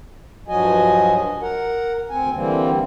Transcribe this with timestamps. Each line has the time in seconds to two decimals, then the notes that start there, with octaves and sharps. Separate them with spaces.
0.48 G2 F3 F#3 F#4 D#5 G#5
1.41 A#4 F#5
2.10 D2 C4 G#5
2.34 D3 E3 G3 A#3 C4